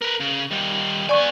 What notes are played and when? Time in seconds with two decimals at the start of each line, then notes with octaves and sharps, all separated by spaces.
0.02 A#4 B4
0.21 C#3
0.51 D#3 G3
1.09 B3 D5 G#5 C#6